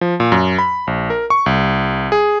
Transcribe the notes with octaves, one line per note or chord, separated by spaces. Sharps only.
F3
A#2
F#2
B5
A#1
A#4
C#6
C2
G#4